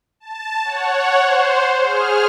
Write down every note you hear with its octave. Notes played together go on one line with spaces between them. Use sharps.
A5
C#5 F#5
C5
G#4 F6